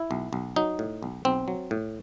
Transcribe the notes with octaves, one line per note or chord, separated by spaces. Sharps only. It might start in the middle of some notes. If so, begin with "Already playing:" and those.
Already playing: E4
B1
B1
F#3 D#4
A2
B1
B1 C4
F#3
A2